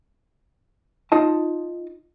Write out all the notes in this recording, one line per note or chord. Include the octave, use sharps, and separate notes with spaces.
D#4 F4 D#5 A5